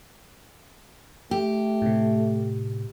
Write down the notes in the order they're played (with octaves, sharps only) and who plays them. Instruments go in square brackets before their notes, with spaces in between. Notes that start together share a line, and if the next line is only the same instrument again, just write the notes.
[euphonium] A3 [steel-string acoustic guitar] G4
[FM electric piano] A2 C3